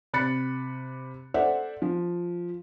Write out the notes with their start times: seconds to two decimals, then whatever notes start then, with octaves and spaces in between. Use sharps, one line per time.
0.13 C3 B5 F#6 A6 C#7
1.34 A4 C5 D5 E5 F#5
1.82 F3